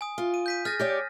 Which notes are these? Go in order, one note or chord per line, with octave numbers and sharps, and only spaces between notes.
G#5 D#6
F4
D#7
G6 B6 D#7
G#4 F6 A6 A#6
G4 C#5 D5